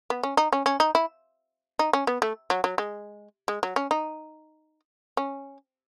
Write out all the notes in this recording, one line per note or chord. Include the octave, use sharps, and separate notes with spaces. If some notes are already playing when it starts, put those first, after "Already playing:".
B3
C#4
D#4
C#4
C#4
D#4
E4
D#4
C#4
B3
A3
F#3
F#3
G#3
G#3
F#3
C#4
D#4
C#4